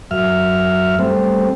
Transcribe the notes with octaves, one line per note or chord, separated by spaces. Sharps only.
F#2 E5 F6
G3 A3 C4